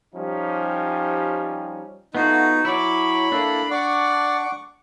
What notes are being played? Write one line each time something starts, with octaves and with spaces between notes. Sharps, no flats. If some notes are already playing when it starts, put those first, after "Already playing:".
F3 G3 C#4 D#4 G4
A3 B3 D#4 F4 F#4
F#3 E4 D5 B5 C#6
A#3 D4 E4 A4
D5 F#5 C#6 D6